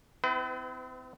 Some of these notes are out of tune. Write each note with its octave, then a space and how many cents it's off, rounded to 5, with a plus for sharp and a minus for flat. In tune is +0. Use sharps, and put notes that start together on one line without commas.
C4 -40 E4 +0 B4 +35